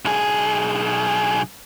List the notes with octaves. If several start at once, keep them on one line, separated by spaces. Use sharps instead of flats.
B1 G#4